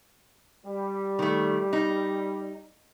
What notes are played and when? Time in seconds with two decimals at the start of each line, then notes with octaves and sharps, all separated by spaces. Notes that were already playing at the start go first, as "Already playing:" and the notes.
0.65 G3
1.19 D#3 A3
1.73 D#4